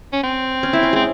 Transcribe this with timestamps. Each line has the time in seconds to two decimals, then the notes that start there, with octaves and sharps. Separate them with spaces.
0.13 C#4
0.23 C4
0.63 C#4
0.73 E4
0.83 C#4
0.93 G#3 C4